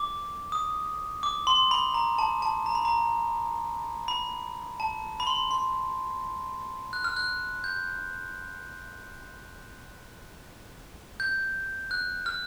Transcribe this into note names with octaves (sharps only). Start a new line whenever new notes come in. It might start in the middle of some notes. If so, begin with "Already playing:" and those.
Already playing: D6
D#6
D6
C6
B5
A#5
A5
A5
A#5
B5
A#5
B5
A5
B5
C6
C6
F#6
F6
F#6
G6
G6
F#6
F6